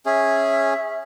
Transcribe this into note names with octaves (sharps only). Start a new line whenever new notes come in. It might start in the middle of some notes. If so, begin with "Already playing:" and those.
C#4 G#4 E5